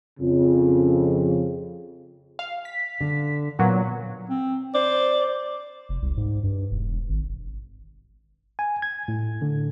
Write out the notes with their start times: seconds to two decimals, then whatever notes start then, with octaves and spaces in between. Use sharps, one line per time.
0.20 F2 C#3
2.39 F5
2.65 B6
3.01 D3
3.59 A#2 F#3 B3
4.29 C4
4.75 C5 D5
5.89 F1
6.02 C2
6.17 G#2
6.43 G2
6.71 E1
7.09 G#1
8.59 G#5
8.82 G#6
9.08 A2
9.42 D3